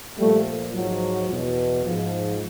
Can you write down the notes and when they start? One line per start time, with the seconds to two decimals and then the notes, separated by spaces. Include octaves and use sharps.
0.18 A#2 F3 G3 A3
0.74 G#2 F3 F#3
1.29 E2 B2
1.84 G#2 F3